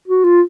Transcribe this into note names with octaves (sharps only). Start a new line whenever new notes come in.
F#4
F4